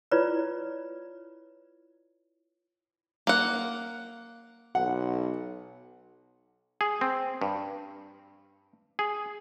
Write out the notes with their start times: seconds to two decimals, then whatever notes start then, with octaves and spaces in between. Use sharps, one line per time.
0.11 E4 F4 B4 C#5 D5
3.27 A#3 F#5
4.75 B1 F#5
6.81 G#4
7.01 C4
7.42 G2
8.99 G#4